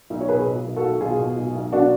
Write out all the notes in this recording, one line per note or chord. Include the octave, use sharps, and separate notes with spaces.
B1
C#5
B2 G#4 B4
B2
B1
F#4 A4
B1
B2 F4 G#4
B2
B1
B1
B2 D4 F#4